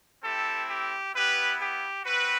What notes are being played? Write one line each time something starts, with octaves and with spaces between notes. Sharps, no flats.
A3 C4 E4 G4 A4
G4
B3 E4 G4 B4
G4
C4 F#4 B4